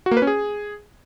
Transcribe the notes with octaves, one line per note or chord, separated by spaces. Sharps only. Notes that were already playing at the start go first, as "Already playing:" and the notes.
F#4
A#3
B4
C#4
G#4